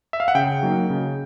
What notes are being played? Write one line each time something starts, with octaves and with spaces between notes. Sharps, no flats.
E5
F5
F#5
C#3 G5
F#3 A#3 D#4
C#3